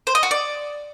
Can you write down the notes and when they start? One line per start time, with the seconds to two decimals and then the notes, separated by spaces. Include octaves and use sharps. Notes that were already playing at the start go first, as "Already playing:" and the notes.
0.07 C5
0.15 D#5
0.23 F#4
0.31 D5